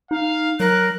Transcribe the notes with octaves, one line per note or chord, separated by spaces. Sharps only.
D#4 F5
F#3 A#4 F#6